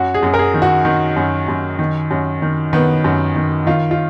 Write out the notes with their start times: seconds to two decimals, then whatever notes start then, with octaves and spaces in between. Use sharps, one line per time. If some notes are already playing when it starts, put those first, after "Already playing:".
Already playing: F#2 F#4
0.14 G#4
0.23 F#2
0.34 A#4
0.39 G#4
0.54 D#3
0.62 F#4
0.85 D#3
1.16 F#2
1.48 F#2
1.79 D#3
2.11 F#2
2.42 D#3
2.73 D#3 B3
3.04 F#2
3.36 D#3
3.66 D#3 F4
3.91 F4